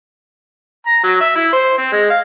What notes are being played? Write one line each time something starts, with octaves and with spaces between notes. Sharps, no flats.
A#5
F#3
E5
E4
C5
C4
G#3
F5